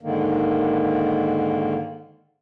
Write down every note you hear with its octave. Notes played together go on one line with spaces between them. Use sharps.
G#2 D3 D#3 A#3